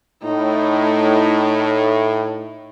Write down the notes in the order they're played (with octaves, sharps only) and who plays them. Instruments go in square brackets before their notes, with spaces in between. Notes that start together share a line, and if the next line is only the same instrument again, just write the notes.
[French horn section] A2 [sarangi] D#4